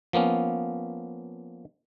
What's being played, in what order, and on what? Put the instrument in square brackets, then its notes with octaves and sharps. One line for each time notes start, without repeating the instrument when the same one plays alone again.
[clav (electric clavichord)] F3 A#3 B3 C#4